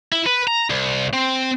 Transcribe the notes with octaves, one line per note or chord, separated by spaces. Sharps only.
E4
B4
A#5
C2
C4